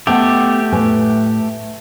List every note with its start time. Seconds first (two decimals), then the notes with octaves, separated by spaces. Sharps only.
0.07 A3 B3 G4 D#5 A5
0.72 A2 B4 G#5